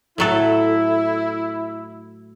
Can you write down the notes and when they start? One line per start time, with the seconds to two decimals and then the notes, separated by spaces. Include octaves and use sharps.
0.18 A2 F#3 E4 A4